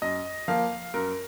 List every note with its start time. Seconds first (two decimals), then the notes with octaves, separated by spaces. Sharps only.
0.02 F#2 D#5
0.48 F3 A#3 F5
0.94 F#2 A#4